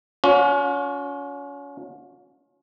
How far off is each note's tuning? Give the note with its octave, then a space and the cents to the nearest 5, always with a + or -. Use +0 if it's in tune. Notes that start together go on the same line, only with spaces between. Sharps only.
C#4 +30 F#4 -45